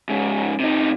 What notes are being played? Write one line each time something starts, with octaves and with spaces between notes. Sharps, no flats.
G#2 C#3
C3 D#4